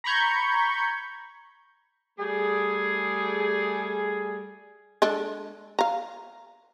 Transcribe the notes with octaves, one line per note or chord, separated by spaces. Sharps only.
A#5 B5 C#6 G6 G#6
G3 A3 G#4
G#3 D4 A4
F5 A#5